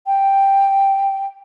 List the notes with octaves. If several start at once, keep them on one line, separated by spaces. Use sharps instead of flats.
G5